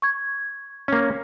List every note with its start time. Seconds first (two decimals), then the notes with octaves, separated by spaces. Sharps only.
0.02 C#6 G#6
0.88 A#3 C#4